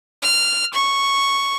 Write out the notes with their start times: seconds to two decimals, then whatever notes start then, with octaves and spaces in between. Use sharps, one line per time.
0.23 F6
0.74 C#6